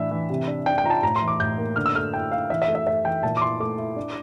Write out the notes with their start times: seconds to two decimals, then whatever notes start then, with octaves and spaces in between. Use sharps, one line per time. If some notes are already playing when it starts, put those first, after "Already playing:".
Already playing: A2 E3 D4 E5
0.11 E3
0.30 C3
0.48 D4
0.66 D4 G5
0.78 G5
0.84 F4 A#5
0.90 A5
1.03 A2 A#5
1.16 C6
1.22 E3
1.28 D6
1.40 A2 G6
1.58 A#3
1.76 D3 F6
1.86 E6
1.95 A3 F6
2.13 E4 G5
2.32 E4 F5
2.50 E3 E5
2.62 E5
2.68 A3
2.75 E5
2.87 A3 E5
3.04 E3 G5
3.23 A#2 A5
3.37 D6
3.41 E4 C6
3.60 A3 D6
3.78 E4
3.96 D4